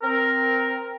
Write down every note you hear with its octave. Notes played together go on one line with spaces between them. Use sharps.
C4 A#4